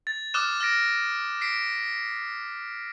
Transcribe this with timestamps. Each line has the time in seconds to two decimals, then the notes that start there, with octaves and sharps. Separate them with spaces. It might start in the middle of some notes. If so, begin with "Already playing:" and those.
0.07 A6
0.34 D6 D#6 F6 F#6 E7
0.60 F6 A6 A#6 D7
1.41 B6 C7 D7